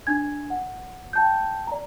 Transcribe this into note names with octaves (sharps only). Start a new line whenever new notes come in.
D4 G#5 G#6
F#5
G5 A5 G6
D5 A#5